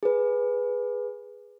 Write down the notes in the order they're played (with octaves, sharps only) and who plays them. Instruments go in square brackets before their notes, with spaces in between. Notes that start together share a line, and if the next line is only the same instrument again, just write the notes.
[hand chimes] G#4 B4